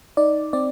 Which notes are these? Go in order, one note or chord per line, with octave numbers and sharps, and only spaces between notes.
D#4 D5
C4 D5